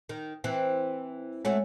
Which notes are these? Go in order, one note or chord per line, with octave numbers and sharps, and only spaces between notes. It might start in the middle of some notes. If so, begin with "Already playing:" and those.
D#3
E3 C4
G#3 A3 E4 F#4 C#5